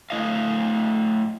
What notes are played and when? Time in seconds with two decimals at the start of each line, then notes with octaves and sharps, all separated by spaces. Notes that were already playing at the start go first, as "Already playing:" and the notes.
0.10 A3 E4 D#5 F5